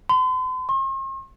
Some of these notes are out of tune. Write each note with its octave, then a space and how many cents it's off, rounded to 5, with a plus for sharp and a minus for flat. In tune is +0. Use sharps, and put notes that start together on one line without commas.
C6 -45
C6 +45